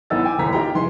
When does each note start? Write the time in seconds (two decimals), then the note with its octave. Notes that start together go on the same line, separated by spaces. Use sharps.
0.10 A1 E3 B3 D#4 E6 A6
0.25 G5 G#5 D6
0.38 D#1 A1 D#2 A#5 B6
0.53 D#4 F4 G4 G5 A#5
0.75 F1 E3 G#3 C6